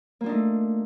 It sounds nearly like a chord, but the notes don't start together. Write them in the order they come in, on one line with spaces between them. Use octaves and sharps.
A#3 F4 D4 D#4 A3